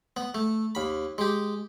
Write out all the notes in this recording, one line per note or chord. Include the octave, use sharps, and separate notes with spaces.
B3
A3
D#2 B5
G#3 G4